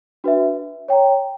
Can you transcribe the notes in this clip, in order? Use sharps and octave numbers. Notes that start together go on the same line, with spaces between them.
D4 F#4 B4 E5
C#5 G5 A#5